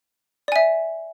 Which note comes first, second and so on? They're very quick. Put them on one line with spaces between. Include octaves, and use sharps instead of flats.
D5 G#5 E5